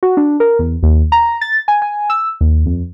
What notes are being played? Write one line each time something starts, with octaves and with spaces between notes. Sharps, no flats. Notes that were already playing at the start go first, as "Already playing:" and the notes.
F#4
D4
A#4
E2
D#2
A#5
A6
G#5
G#5
E6
D#2
F2